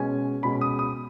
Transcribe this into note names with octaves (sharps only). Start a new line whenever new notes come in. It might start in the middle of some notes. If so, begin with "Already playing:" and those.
Already playing: B2 G#3 C#4 G#5
B2 G#3 C#4 B5
D#6
D#6